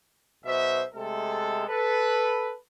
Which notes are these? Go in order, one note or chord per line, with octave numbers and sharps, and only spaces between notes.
B1 B2 C5 E5
C3 G#3 A3 A4
A4 B4